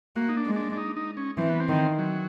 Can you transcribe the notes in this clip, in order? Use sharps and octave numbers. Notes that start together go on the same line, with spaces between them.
A#3 F#4
D#4
D4
G#3
D4
D4
D#4
D#4
C#4
E3 C4
B3
C4
D#3
F#3